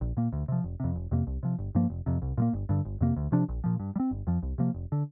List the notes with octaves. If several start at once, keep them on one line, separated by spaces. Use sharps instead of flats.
A#1
A#2 A#3
D2
C3 F3
F1
F2 C3
F1
F2 C3 A#3
C2
C3 F3
G1
G2 F3 A#3
F1
F2 C3
C2
A#2 G3 A#3
G1
G2 D3
G1
F2 C3 A#3
D2
C3 F3 D4
A#1
A#2 F3
G2
G3
C4
G1
F2 F3
C2
C3 F3 A#3
F1
D3